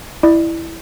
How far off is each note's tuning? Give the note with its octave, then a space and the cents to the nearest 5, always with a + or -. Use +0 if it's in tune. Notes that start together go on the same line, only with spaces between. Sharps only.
E4 +0 D5 +35